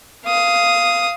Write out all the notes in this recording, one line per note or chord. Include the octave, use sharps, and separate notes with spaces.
F5 D#6